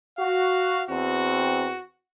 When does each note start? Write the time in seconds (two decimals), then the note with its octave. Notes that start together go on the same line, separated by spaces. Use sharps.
0.18 F#4 F5
0.89 E2 C4 F#4